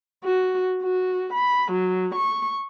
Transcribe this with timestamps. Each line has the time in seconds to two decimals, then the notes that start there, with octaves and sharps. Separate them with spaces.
0.24 F#4
0.83 F#4
1.34 B5
1.72 F#3
2.15 C#6